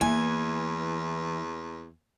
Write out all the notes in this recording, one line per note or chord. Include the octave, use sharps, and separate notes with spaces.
E2 E3 A#3 G#5